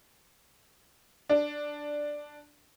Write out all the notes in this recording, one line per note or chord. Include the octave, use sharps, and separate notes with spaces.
D4